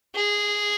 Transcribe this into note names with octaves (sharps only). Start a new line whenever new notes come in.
G#4